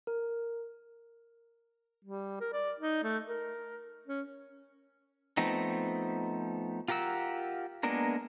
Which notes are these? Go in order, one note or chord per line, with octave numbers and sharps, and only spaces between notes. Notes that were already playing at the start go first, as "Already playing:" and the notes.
A#4
G3
A#4
D5
D#4
A3
A#4
C#4
F3 A3 B3 C4 D#4
F4 G4 A#4 F#5 E6
G#3 A#3 B3 D4 A#4